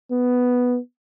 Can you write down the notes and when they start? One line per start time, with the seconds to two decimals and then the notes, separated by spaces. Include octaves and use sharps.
0.11 B3